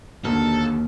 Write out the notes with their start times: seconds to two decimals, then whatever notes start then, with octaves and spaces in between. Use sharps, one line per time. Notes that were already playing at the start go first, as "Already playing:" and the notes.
0.25 D#2 B2 D3 A#3 A4